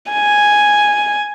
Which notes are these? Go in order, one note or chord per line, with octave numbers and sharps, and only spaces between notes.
G#5